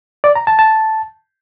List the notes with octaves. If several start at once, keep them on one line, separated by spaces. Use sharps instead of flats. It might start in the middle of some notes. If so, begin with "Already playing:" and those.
D5
A#5
A5
A5